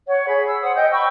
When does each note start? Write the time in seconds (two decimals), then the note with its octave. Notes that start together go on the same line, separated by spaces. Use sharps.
0.08 C#5 F#5
0.28 G#4 B5
0.46 E6
0.62 C5 F#5 D#6
0.75 D#5 G5 G6
0.92 G5 B5 C#6 E6